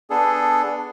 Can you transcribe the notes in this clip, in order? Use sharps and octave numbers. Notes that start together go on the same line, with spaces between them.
B3 D4 G#4 A4